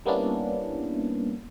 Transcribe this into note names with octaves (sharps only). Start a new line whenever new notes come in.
G3 A#3 B3 C#4 D4 E4